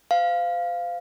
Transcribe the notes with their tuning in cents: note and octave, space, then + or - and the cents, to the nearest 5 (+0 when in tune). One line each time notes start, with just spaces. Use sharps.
C5 -45 F5 +0